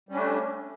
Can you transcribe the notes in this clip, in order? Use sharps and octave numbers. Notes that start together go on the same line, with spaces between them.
G3 A3 C#4 D4